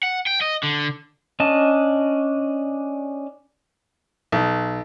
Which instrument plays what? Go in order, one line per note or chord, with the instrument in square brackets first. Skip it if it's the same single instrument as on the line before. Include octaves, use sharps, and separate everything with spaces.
[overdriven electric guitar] F#5
G5
D#5
D3
[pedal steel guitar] C#4 D4 D#5 A5
[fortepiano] B1